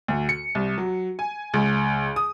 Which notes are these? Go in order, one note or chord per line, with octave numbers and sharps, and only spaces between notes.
D2
C#7
C2
F#3
G#5
C#2
D#6